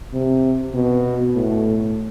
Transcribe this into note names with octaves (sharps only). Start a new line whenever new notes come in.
C3
B2
A2